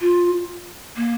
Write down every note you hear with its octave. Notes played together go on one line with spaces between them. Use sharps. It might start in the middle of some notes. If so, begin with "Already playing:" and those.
F4
A#3